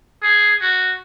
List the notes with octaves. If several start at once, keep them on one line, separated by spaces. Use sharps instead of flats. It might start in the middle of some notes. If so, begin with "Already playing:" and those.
G#4
F#4